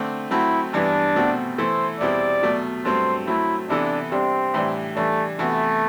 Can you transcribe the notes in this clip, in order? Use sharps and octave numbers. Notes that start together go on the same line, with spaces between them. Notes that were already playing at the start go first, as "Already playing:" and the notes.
Already playing: D3 A3 C4
F#3 A3 C4 E4 F#4
G2 E3 G3 B3 D4 E4
B2 A3 C4 F#4
E3 A3 E4 A4 C5
E2 B2 G3 C4 E4 D5
B2 F#3 A3
G2 F#3 A3 C4 C5
F#3 A3 C4 E4
C3 E3 B3 D4 E4 A4
C3 G3 C4 D4
A2 E3 G3 D4
E3 G3 A3 D4
C3 E3 A3 B3 F#4